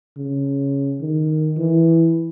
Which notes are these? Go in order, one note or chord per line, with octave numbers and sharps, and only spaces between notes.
C#3
D#3
E3